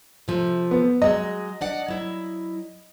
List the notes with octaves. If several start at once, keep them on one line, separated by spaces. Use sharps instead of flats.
C3 F3 A3
B3
F#3 G#3 D#5
D4 D5 F#5
F#3 E4